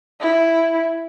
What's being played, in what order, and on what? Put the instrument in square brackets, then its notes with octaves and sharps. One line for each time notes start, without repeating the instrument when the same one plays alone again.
[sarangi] E4